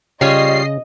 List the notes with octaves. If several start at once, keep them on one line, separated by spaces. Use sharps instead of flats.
C#3 G3 F4 C#5 D#5 C7